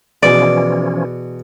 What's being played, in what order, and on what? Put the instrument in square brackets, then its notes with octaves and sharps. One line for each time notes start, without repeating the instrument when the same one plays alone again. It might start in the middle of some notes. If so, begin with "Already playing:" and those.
[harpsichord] E2 B2 [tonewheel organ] E3 F3 C#4 [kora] D5